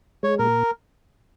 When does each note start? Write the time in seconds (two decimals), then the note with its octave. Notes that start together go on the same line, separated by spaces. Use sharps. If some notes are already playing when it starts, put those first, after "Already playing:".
0.23 G#3 C#5
0.39 A#2 A#4